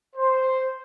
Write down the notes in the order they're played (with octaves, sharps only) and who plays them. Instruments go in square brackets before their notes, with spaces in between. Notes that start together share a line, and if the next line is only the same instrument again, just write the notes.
[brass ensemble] C5